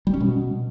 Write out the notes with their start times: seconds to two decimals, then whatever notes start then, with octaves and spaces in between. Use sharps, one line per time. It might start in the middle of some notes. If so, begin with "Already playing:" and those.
0.07 G3
0.14 C#4
0.20 B2